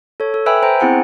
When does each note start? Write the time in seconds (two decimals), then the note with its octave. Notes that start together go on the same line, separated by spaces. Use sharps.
0.20 A4 C#5
0.34 A4
0.46 B4 E5 G5 G#5 B5 E6
0.63 C5 G5 A#5
0.80 B3 C4 E4 G#4 F#5 G#5